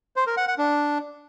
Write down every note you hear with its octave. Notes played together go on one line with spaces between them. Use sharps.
C5
A#4
F#5
F#5
D4